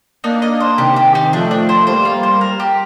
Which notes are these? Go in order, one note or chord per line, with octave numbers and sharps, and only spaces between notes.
A#3 D4 D#4
D#5
C5
C3 D#3 G4
G4
D#4
F3 A3 D4
D4
C5
G3 A#3 C5
F4
C5
A#4
G4